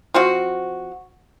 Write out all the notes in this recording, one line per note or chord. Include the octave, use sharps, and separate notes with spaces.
F3 C4 F#4